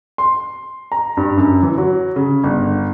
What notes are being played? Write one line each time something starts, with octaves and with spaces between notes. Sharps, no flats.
C6
A#5
G2
F#2
E3
F#3
C#3
G1